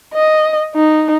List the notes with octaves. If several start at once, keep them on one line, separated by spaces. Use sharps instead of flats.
D#5
D#4